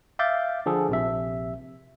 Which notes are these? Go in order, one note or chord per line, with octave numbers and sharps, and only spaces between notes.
E5 F5 D6 G6 A6
D3 F3 G#4 A4
A#1 C3 E5